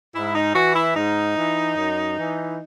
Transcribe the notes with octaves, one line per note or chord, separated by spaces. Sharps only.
G#2 E4
D#4
E3 F#4
E4
G#2 D#4
E3
F#2
E3